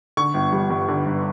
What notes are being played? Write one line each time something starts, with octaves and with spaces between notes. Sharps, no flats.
D3 C#6
G1
G3
G2
D3
G1